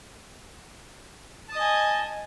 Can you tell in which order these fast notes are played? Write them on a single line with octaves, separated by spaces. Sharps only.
A5 D#6 D#5 G#5